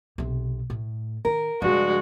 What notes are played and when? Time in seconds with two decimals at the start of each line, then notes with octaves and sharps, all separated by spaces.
0.18 B1 C3
0.70 A2
1.25 D#3 A#4
1.62 G2 C#3 F3 G#3 F#4